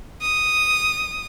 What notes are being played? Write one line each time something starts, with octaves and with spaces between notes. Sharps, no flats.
D#6